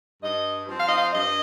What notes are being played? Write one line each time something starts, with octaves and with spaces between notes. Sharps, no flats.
G2 D#5
F3 C4
F5
D#5
F5
G2 D#5